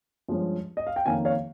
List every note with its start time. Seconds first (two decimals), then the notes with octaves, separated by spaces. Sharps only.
0.28 G2 F3 G#3 C#4
0.77 D#5
0.87 F5
0.96 G5
1.06 F2 D#3 A#3 C#4 F5 G#5
1.25 C#5 F5